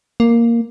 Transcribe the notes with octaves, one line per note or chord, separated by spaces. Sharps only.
A#3